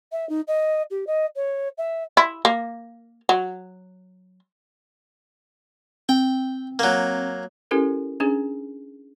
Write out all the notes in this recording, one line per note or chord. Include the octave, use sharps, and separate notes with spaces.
E5
D#4
D#5
G4
D#5
C#5
E5
E4
A#3
F#3
C4 G5
F#3 A#3
C#4 E4 G4 A4 A#4
C#4 D4 G#4